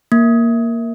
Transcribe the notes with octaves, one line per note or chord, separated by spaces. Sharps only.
A#3